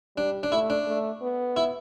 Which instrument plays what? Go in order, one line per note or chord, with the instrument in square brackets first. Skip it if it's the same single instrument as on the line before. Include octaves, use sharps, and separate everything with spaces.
[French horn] G3 [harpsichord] D4
[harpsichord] D4
[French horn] A3 [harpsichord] E4
[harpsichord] D4
[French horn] A3
B3
[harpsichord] E4